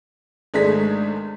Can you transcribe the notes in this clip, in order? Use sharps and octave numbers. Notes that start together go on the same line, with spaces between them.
G#1 G#3 A3 D4 G#4 B6